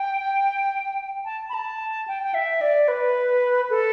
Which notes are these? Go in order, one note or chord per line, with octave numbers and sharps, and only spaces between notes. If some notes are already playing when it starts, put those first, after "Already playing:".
Already playing: G5
A5
B5
A5
G5
G5
E5
D5
B4
A4